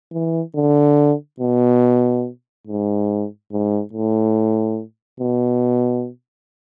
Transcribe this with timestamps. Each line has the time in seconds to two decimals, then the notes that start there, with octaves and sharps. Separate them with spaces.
0.12 E3
0.55 D3
1.40 B2
2.67 G#2
3.52 G#2
3.93 A2
5.20 B2